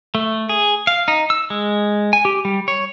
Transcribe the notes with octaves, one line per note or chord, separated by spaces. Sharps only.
A3
G#4
F5
D#4
E6
G#3
G#5
G4
G3
C#5